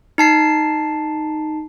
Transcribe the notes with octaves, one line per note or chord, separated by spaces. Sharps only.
D#4 A5 C7